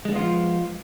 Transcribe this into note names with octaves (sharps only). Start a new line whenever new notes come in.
F3 G#3 B3 D4 F4